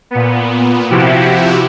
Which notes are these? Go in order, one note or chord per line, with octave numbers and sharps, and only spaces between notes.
A#2 B3
C3 F3 E4 F#4 G4